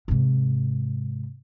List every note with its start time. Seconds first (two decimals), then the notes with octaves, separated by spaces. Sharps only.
0.08 G#2 C3